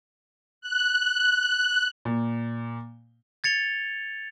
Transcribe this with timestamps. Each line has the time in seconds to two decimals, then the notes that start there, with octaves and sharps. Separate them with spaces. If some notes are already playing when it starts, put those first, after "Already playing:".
0.61 F#6
2.05 A#2
3.44 G#6 A6 C#7 F7 G7